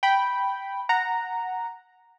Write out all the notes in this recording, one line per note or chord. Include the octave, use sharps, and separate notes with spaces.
G5 B5
F#5 A#5